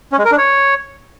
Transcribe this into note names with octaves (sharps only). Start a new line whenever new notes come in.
C#4
G#3
A#4
D4
C#5